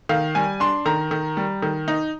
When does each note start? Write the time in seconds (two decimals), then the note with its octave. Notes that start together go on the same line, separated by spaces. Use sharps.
0.09 D#3 F5
0.35 G3 G#5
0.60 D4 C6
0.86 D#3 A#5
1.11 D#3
1.37 G3
1.62 D#3
1.88 D#4